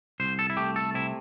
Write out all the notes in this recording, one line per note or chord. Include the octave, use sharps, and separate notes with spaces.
C2 C5
A4
E4
A3 G4
A4
C3 E4